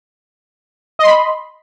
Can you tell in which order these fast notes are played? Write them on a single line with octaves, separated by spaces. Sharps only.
D#5 C6 B5